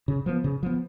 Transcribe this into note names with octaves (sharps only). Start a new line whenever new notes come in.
C#3
F3 B3
C#3
F3 B3